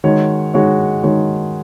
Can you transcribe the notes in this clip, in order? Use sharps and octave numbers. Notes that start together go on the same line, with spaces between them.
D#3 G#3 F#4 C#5
D#3 G#3 F#4 C#5
D#3 G#3 F#4 C#5